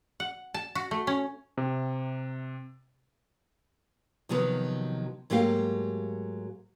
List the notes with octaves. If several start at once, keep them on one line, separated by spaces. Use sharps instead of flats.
F#5
A5
F#4
A3
C#4
C3
C3 D#3 F3 F#3 B3
G#2 F#3 A3 A#3 G4 F5